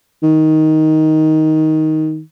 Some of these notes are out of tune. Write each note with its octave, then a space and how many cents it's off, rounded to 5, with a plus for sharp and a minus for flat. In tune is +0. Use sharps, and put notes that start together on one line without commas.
D#3 +10